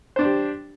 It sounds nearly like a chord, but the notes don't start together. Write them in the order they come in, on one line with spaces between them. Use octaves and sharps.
C5 D4 D5 G4